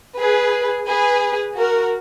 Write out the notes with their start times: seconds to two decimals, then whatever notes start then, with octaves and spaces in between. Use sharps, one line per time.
0.19 G#4 B4
0.88 G#4 B4
1.58 F#4 A#4